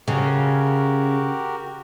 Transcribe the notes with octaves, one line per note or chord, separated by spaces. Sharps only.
C#3 F#4 G4 A#4